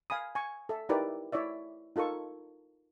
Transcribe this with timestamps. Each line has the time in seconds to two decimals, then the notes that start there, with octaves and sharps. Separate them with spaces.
0.10 F5 G#5 B5 D#6
0.35 G#5 C#6
0.69 A4 E5
0.89 D#4 E4 G4 A#4 B4 D5
1.32 E4 C#5 D5 E5
1.96 D#4 F4 A4 A#4 C#6